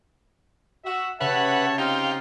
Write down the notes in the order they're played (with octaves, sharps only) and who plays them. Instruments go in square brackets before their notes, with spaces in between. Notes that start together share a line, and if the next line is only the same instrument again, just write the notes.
[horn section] F#4 [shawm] E5
[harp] C#3 [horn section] G4 C#5 E5 [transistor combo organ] B4 F#5 [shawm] A5
[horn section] C4 D#4 G4 [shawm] F4 [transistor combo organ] F5 G5